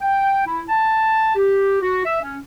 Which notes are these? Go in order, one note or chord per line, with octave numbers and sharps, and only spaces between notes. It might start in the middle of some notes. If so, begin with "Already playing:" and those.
G5
E4
A5
G4
F#4
E5
C#4